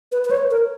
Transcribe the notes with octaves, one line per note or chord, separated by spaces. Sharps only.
B4
B4
C#5
A#4